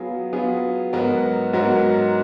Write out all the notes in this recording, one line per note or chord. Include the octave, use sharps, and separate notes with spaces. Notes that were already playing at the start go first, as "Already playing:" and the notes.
Already playing: F#3 B3 F4 G#4
F#3 B3 F4 G#4
G#2 F#3 B3 F#4 A#4
G#2 F#3 B3 F#4 A#4